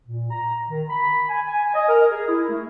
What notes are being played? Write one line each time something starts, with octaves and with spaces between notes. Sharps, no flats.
A#2
A#5
D#3
B5
G#5
G#5
D#5
A#4
G#4
E4
A3